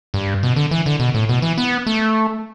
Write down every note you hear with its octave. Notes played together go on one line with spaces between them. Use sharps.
G2
B2
D3
E3
D3
B2
A2
B2
E3
B3
A3